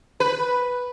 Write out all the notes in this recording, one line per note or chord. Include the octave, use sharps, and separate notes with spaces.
B4